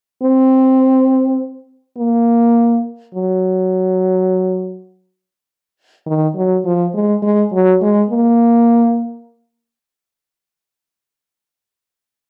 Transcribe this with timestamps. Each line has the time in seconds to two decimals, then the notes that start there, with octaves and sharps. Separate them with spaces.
0.23 C4
1.98 A#3
3.15 F#3
6.07 D#3
6.36 F#3
6.65 F3
6.94 G#3
7.23 G#3
7.52 F#3
7.82 G#3
8.10 A#3